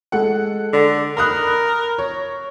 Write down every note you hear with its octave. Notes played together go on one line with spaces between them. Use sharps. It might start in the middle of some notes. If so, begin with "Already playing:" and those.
G#3 A4 F#5
D3
A#4 B5 D#6 F#6
C#5